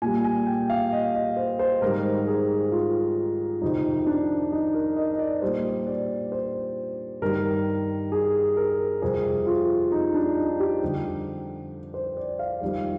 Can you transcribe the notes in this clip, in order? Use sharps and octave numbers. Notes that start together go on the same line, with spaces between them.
A#2 G3 G#5
G#5
G5
F5
D#5
D#5
C5
C5
G#2 D#3 G3 A#4
G#4
F4
F2 C3 D#3 D#4
D4
D#4
A#4
D#5
D#5
D5
A#2 G3 C5
D5
C5
G2 D#3 G3 A#4
G#4
A#4
F2 C3 G3 G#4
F4
D#4
D4
D#4
G4
F2 D3 G3
C5
D5
F5
F2 D#3 G3